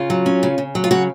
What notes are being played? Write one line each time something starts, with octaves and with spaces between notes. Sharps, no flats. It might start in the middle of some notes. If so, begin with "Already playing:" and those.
Already playing: C#3 F4
F#3
C#4
C#3
C#3
F#3
F4
C#3 F#4